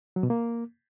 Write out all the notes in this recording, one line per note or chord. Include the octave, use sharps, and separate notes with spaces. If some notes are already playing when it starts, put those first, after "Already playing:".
F#3
B2
A#3